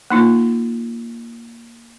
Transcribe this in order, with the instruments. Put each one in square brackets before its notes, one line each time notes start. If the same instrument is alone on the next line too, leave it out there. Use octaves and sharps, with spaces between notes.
[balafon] A#3 D#4 F4